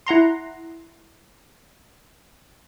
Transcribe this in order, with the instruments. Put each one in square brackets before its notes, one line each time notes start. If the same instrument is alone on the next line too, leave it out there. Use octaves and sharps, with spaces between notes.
[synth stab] E4 F#5 A#5 C6